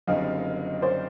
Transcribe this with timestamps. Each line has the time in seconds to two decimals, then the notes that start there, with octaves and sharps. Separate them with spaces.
0.07 F#1 F#2 D3 G3 C4 D#5 F5
0.82 C5 D5